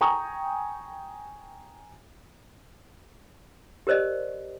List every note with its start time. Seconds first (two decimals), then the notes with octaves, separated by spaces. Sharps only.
0.01 G5 G#5 A#5 C#6 D#6
3.87 G4 A#4 C5 D5 D#5